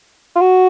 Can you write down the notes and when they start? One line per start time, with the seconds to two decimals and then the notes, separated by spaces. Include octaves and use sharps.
0.35 F4
0.41 F#4